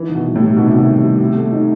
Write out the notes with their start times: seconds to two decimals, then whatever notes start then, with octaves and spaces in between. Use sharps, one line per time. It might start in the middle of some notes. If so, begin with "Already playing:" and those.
Already playing: E3 D#4
0.09 D#3
0.15 B2
0.25 G3
0.36 A2
0.41 G4
0.56 B2 D#4
0.66 C3
0.72 B2 D#3
0.88 G3
1.04 G4
1.20 G4
1.36 A3
1.52 D#4